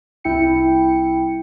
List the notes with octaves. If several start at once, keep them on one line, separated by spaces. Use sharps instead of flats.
C2 E4 G5 C#7